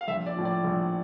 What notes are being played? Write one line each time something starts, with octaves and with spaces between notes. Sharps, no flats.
F5
A#1 E5
D5
A2 F3
D5
A#1